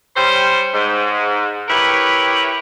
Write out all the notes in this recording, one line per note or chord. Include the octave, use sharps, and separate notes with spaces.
G3 C#4 C5
G#2
E4 G4 A#4 B4 C#5